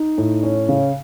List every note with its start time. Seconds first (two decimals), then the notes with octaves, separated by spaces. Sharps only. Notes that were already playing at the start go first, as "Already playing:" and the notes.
Already playing: D#4
0.18 A2
0.43 C#4
0.69 C#3